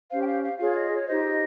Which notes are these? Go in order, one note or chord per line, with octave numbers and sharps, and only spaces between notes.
C#4 G4 C5 F5
G5
F5
F5
F4 G#4 C#5 F5
D#5
C#5
D#4 G4 C5 D#5